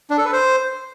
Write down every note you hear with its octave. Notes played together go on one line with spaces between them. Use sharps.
D4
A4
B4
C5